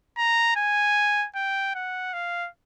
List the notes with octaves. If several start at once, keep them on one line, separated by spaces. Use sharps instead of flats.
A#5
G#5
G5
F#5
F5